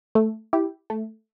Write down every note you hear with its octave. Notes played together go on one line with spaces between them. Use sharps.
A3
E4 G4
A3